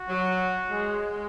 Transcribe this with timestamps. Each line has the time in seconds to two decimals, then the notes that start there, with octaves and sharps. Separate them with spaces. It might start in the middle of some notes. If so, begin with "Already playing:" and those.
Already playing: F#4
0.09 F#3
0.69 G#3